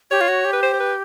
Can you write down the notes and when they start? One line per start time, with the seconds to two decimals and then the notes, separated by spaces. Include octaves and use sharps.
0.11 G4 C#5
0.21 F4
0.28 F#4
0.45 G4
0.53 B4
0.63 C5
0.73 C5
0.80 B4